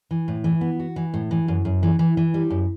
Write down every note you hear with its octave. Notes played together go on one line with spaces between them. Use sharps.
E3
A2
E3
B3
F#4
E3
A2
E3
F#2
F#2
E3
E3
E3
G3
F#2